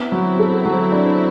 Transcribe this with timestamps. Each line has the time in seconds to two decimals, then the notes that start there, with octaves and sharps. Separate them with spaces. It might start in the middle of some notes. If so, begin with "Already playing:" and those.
Already playing: B3 C4 E4
0.12 F#3
0.39 A4
0.65 F#3
0.92 D4